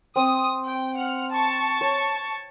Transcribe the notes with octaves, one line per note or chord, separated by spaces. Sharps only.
C4 D#6
G5
F#5 F6
A5 C#6
C#5